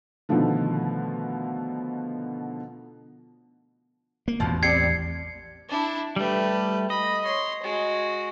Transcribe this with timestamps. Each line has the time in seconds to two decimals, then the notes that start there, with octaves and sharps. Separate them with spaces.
0.29 B2 D3 D#3 F3 A3
4.28 A#3
4.40 A1 E2 B2 F3
4.63 G3 C4 D5 G#6 C7 C#7
5.69 D4 E4
6.16 G3 A3 G4 B4
6.90 D#5 B5
7.24 C#5 C6
7.63 G#3 F#4